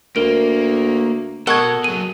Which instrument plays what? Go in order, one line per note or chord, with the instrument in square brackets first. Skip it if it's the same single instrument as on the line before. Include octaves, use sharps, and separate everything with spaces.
[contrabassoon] D2 [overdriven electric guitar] A#3 [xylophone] A#4 D7
[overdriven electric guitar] B2 [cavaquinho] A4 D#5 F#5 [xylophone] A#4 C#6 G#6
[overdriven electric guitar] F#3 G#4 [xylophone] D#7